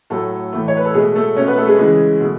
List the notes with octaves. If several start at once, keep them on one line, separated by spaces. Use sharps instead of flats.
A2 F#3 A3 A4
A2 E3 A3
C#5
B4
A4
B2 G#3 A3 G#4
A3 A4
B2 A3 C#4 C#5
B3 B4
A3 A4
G#3 G#4
C#3 E3 G#3 G#4
B2 A3